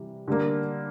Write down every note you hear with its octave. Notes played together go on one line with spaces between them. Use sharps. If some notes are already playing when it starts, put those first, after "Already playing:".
Already playing: C3 E3 G3
D3 G3 A#3